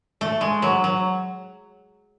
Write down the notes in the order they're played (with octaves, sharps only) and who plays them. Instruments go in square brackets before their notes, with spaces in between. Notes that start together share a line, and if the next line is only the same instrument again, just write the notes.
[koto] A3
G#3
F#3
F#3